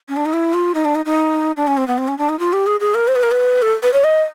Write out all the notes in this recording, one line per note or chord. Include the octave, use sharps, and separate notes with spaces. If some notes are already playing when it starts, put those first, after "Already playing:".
C#4
D4
D#4
E4
F4
D#4
D4
D#4
D#4
D4
C#4
C4
B3
C4
C#4
D4
D#4
F4
G4
G#4
G#4
A#4
C5
B4
A#4
B4
A4
B4
C#5
D#5